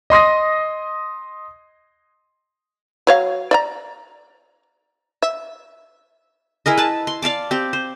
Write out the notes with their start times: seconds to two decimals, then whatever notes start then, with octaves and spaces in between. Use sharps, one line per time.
0.10 D#5 C6 D#6 A#6
3.07 F#3 C#5 F5
3.51 D5 E5 A#5
5.23 E5
6.66 E4 G#4 A#4 D#5
6.78 B4 A5
7.07 C6
7.22 D5 F5 A5 D6
7.51 C4 G4
7.73 C5